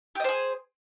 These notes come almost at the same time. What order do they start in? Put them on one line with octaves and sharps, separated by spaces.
G4 D#5 C5 G#4